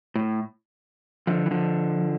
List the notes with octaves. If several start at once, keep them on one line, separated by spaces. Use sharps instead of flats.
A2
D3 F3
E3
D3 F3